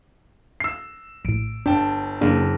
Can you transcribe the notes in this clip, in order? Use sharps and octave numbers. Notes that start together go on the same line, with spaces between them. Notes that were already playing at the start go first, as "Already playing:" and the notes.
E6 C7
A#1 A2 D7
G1 D4 G5 A5
F#1 A#3 D4